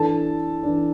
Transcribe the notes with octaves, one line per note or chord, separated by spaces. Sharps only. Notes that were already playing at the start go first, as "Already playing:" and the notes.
Already playing: E3 D4 A4 A5
E3 D4